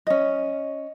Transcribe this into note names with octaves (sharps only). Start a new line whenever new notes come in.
C#4 D#5